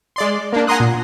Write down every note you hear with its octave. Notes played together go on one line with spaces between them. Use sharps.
G#3 D5 C6
A#3 D4
F#5 G#5 A#5 C6 D#6 F#6
A#2